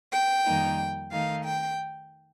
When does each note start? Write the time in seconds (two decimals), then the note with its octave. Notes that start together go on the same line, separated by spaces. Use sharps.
0.12 G5
0.45 F2 D#3 G3 A#3 D#4
1.12 D#3 A3 D#4 F5
1.45 G5